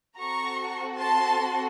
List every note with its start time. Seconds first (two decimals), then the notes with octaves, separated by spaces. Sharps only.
0.19 C4 F#4 A4 A#5 C#6
0.99 A5 C6